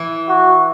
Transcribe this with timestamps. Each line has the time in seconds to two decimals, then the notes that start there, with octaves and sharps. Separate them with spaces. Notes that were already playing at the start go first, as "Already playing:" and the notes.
Already playing: E3
0.29 F#4